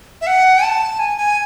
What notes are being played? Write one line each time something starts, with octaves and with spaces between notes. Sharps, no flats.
E5
F#5
A5
G#5
G#5